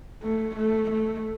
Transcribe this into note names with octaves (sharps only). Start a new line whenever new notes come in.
A3
A3
A3